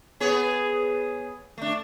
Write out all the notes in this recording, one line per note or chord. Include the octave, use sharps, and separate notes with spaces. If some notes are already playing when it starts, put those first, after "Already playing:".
B3 G#4 C#5
A3 D4